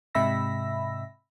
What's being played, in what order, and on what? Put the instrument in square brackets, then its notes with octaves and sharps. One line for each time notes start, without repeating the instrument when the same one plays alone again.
[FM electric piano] G#2 C3 E5 B5 E6 A#6